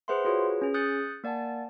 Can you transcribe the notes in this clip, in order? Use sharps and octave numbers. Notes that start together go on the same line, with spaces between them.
G#4 B4 C5 E5 F#5 C6
F4 F#4 G#4 B4 C#5
C#4 G#4
D#6 F#6 G6 A6 C#7
A#3 D5 F#5 G#5 A5